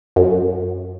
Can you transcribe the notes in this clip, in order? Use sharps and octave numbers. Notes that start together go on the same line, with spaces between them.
F#2